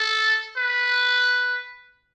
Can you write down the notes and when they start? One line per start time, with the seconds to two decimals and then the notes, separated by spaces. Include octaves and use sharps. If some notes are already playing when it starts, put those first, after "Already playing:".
Already playing: A4
0.58 B4